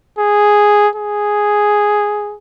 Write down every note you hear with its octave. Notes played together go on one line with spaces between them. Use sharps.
G#4
G#4